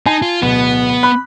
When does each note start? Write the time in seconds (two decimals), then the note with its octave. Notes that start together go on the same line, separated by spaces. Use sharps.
0.06 D#4 G#5 A5 C7
0.22 F4
0.42 D1 B2 B3
1.03 B5 F#6